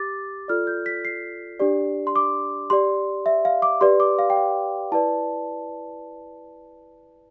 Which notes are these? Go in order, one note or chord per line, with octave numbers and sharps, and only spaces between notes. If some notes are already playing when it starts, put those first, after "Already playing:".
Already playing: G4 D6 A6
F4 A4 D5 F6
G6
B6
C7
D4 G4 D5
C6
D6
G4 D5 C6
E5
F5
D6
G4 B4 D5 C6
D6
F5
G5
F5
E4 B4 D5 A5